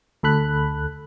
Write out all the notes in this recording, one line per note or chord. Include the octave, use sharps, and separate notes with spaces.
D2 A4 B5 F#6